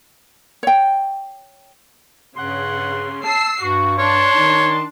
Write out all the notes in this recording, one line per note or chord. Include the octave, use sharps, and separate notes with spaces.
C#5 G5
G2 C#3 F#5 C6
A5 E6 C7
G2 F#4 C#6
D4 C#5 A5 C6
D#3 D#4